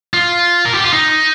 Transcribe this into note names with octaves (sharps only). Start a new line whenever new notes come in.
F4
A#4
G4
F4
D#4